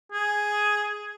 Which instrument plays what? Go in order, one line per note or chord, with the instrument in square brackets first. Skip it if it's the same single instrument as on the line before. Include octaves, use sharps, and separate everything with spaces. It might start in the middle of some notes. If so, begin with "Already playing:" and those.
[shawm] G#4